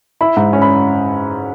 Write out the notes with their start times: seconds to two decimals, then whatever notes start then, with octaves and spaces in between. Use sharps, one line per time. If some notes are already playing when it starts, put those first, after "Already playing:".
0.21 E4 B5
0.37 G#2
0.53 C#4
0.62 B5